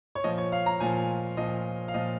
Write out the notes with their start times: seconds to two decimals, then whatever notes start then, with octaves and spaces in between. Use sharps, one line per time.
0.15 C#5
0.24 A#2 F3 D#5
0.38 C#5
0.52 F5
0.66 A#5
0.80 A#2 F3 G#5
1.37 A#2 F3 D#5
1.88 F5
1.94 A#2 F3 D#5